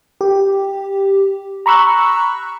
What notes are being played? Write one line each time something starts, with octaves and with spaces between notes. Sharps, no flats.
G4
A#5 B5 C#6 E6 F#6